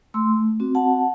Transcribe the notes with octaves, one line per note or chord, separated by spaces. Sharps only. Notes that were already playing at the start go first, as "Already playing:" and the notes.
A3 C6 E6
C4 F#4
F#5 A5